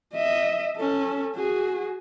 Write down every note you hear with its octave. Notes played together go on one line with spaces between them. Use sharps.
D#5 E5
C#4 A4
F#4 G#4